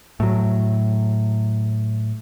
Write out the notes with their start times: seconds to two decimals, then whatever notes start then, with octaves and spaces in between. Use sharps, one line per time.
0.20 A2 F#3